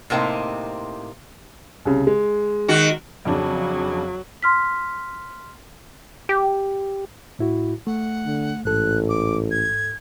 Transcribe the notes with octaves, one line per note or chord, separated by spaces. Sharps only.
A2 C3 A#3 C4 D#4
C2 C#3
G#3
D#3 F#4
F2 C#3 F#3 D4
C6 F6 B6
G4
A2 E4 F#4
A3 F#5
D3
A1 G#2 A4 F#6
D6
G#6